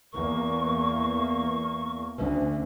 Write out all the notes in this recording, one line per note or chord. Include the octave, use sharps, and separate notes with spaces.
E2 A#3 C#6
D2 C#4